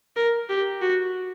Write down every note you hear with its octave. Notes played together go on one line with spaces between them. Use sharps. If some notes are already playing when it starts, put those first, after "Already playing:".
A#4
G4
F#4